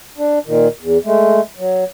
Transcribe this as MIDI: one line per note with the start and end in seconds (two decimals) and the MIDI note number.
0.18 0.39 62
0.46 0.68 46
0.46 0.68 51
0.81 0.98 40
1.05 1.41 56
1.05 1.41 57
1.58 1.84 54